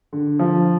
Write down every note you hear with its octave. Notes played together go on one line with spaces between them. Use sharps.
D3
F3